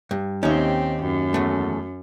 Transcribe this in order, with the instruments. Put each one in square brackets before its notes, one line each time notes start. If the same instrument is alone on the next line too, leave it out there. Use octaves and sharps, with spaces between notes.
[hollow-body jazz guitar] G2
[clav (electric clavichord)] D#2 C#4 [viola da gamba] C4 G4 [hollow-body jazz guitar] D#4 E5
[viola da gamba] F#2
[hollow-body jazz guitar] E2 A3